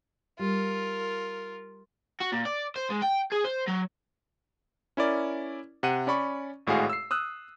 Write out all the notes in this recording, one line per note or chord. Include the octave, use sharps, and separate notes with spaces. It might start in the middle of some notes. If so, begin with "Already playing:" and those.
G3 F4 A#4
F#4
A#2
D5
C5
G#3
G5
G#4
C5
F#3
C#4 E4 A#4 D5
C3 F#5 D#7
C#4 D5 B5 C#6
G#1 A2 G#3 F#4 G#4 F5
E6 C7
D#6 E6 F#6